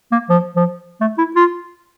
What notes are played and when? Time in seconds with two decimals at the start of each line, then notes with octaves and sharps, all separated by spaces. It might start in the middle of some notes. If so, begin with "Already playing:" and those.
0.12 A#3
0.30 F3
0.56 F3
1.01 A3
1.18 E4
1.36 F4